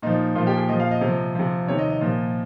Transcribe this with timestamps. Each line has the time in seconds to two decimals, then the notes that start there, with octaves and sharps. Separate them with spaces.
0.02 A#2 F3 D#4
0.35 A#2 F4
0.39 F3
0.47 G4
0.58 G#4
0.69 A#2 D#5
0.72 F3
0.80 F5
0.91 D#5
1.01 C3 F3
1.35 C3 F3
1.67 C3 D#3 C#5
1.78 D#5
1.90 D#5
2.01 A#2 F3